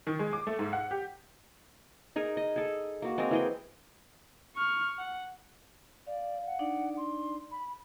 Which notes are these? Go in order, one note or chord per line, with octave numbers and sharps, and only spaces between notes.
D#3
G#3
D6
A3
G#2
F#5
G4
D#4 G#4 A#4
D#5
G#4 A4
A#3 F#4
G#3 A#3 C4 A#4
E3 G#4 G5
C#6 F6
F#5
D5 F5
F#5
D4 D#4 D5
C6
B5